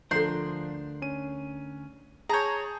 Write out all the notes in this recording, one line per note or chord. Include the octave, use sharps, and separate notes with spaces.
D2 F3 D4 A4 A#4 C6 G6
C#4 D#7
G#4 C#5 A5 A#5 G6